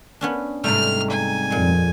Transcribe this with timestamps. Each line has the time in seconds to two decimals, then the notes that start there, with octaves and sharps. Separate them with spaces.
0.21 B3 C#4 D4
0.64 G#2 C3 G3 A3 F6
1.10 G#5
1.51 F2 A#2 G#3